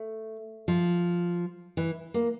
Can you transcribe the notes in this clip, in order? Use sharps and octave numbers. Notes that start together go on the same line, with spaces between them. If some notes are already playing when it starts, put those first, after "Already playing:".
Already playing: A3
F3
E3
A#3